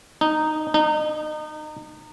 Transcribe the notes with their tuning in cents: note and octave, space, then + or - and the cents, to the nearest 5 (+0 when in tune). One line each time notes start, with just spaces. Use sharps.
D#4 -10
D#4 -30